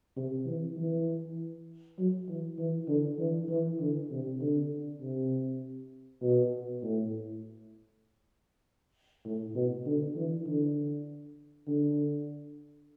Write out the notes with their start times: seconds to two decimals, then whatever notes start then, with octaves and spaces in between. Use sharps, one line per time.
0.16 C3
0.46 E3
0.77 E3
1.98 F#3
2.28 E3
2.58 E3
2.88 D3
3.19 E3
3.49 E3
3.80 D3
4.11 C3
4.41 D3
5.01 C3
6.22 B2
6.83 A2
9.25 A2
9.55 B2
9.86 D3
10.16 E3
10.47 D3
11.67 D3